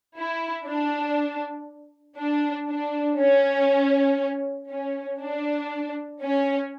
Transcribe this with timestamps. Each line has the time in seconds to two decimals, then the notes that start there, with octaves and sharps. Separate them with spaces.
0.16 E4
0.66 D4
2.18 D4
2.68 D4
3.19 C#4
4.70 C#4
5.21 D4
6.22 C#4